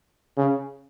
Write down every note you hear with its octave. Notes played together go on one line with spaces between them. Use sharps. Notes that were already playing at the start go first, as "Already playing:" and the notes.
C#3